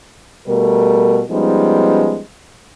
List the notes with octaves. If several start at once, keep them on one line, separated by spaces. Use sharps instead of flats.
B2 G3 A3 A#4
F3 G3 G#3 B3 C#4 D#4